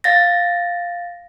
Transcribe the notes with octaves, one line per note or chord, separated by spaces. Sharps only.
F5 A6 A#6